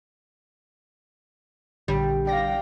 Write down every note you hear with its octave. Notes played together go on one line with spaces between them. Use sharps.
A#1 D3 G3 G5
D5 F5 G5 A#6